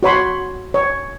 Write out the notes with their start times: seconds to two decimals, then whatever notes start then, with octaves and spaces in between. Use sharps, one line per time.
0.03 F#4 C#5 B5 C6
0.74 C#5